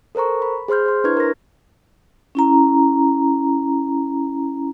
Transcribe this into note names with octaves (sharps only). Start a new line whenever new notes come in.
A4 A#4 C5 A#5 C#6
B5
G#4 C5 C6 F6 G6
C5 C6
D4 E4 B4 C#6 F6 G#6
A#4 A#6
C#4 E4 A#5